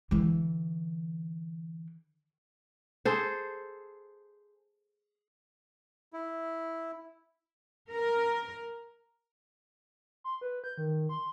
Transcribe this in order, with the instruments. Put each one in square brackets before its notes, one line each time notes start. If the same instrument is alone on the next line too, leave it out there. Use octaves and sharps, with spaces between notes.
[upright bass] D3 E3
[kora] G#4 A4 C5
[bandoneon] E4
[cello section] A#4
[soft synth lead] C6
B4
G6
D#3
C6